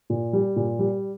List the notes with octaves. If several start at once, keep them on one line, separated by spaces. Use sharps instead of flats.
A#2
G3
A#2
G3